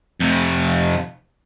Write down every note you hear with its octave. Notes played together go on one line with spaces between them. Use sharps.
F2 C3